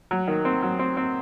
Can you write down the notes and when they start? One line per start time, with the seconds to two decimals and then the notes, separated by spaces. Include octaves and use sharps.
0.11 F#3
0.27 D#3
0.45 C4
0.62 F#3
0.79 C4
0.97 C4